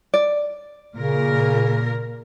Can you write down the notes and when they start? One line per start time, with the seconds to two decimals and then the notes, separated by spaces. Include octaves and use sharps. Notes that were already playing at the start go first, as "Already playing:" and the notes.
0.14 D5
0.95 A#2 C#3 A#4